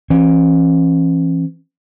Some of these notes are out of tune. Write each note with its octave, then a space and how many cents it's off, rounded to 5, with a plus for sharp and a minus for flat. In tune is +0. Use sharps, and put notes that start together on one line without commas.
E3 +20 C#4 -40